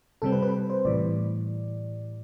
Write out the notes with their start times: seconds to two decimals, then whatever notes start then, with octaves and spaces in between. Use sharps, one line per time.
0.22 C3 G3 C4 A4
0.32 B4
0.43 B4
0.70 C5
0.85 A2 E3 G3 D5